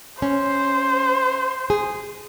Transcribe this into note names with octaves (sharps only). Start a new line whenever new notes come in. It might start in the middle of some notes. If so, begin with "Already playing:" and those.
C#4 C5
G#4